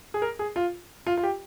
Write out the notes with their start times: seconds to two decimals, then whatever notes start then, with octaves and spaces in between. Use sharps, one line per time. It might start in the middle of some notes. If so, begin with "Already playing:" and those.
0.14 G#4
0.22 A#4
0.39 G#4
0.56 F4
1.07 F4
1.17 F4
1.23 G4